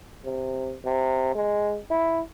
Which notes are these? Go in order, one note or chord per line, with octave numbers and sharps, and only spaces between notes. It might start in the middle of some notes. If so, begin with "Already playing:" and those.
C3
C3
G#3
E4